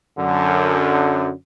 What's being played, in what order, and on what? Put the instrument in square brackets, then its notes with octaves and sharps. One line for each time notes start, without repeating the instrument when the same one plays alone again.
[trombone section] F#2 D3